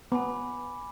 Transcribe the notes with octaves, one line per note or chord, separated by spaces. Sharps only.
B3 G#5 B5 D6